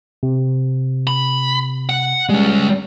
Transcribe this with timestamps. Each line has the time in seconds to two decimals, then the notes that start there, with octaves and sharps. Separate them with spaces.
0.23 C3
1.07 B5
1.89 F#5
2.29 G3 G#3 C#4